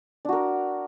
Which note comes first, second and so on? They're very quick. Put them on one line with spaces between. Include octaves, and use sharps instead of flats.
D4 F#4 A#4